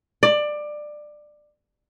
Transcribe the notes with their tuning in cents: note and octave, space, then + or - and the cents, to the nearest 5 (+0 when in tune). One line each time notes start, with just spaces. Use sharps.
D5 +20